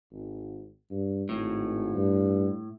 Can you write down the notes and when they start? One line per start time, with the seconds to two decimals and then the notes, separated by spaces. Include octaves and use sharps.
0.11 G#1
0.90 G2
1.29 G#1 A2
1.95 G2